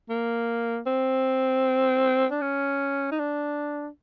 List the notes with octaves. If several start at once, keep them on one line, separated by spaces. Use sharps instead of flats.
A#3
C4
D4
C#4
D#4
D4